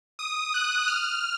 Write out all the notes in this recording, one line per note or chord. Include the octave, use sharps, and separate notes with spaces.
D#6
F#6
F6